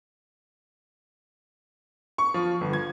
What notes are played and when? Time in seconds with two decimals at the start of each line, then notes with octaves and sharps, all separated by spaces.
2.18 C#6
2.34 F3
2.61 G1
2.73 G#6